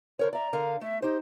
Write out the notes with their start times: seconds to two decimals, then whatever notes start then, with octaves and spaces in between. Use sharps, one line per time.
0.19 D3 A#4 C5 C#5
0.33 D5 E5 A#5
0.53 D3 A#4 F5
0.81 A3 E5
1.02 D#4 G4 C5